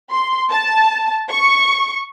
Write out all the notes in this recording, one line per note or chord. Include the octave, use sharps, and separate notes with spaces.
C6
A5
C#6